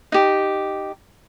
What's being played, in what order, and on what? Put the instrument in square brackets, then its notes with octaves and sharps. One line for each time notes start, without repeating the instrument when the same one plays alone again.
[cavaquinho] D#4 G4